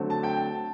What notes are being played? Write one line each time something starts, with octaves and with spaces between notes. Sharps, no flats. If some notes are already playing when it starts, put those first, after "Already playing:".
Already playing: D3 F#3 A3 C4
A5
G5
A5